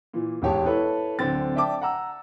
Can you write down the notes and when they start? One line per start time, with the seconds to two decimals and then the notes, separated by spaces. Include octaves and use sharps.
0.14 A#2 E3
0.42 E1 G#2 G#3 G4 C#5 A5
0.66 E4 A4 B4 C#5
1.19 D1 D3 C4 A6
1.56 D5 E5 G5 A5 D6
1.82 F#5 A#5 E6